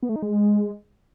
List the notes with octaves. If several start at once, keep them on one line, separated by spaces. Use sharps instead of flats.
B3
A3
D#4
G#3